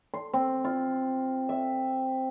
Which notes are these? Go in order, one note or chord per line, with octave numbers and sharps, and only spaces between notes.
C6
C4
F4
E5